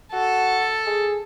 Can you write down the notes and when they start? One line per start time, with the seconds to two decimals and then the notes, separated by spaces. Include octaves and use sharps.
0.12 F#4 A4
0.86 G#4